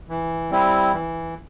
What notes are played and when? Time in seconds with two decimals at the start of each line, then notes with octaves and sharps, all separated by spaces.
0.09 E3
0.51 G3 C4 E4
0.93 E3